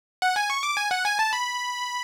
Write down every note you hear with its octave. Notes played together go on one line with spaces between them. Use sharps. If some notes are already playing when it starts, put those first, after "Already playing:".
F#5
G#5
C#6
D6
G#5
F#5
G#5
A5
B5